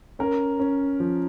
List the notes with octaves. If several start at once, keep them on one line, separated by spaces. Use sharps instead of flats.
C#4 A#4
C#4
F3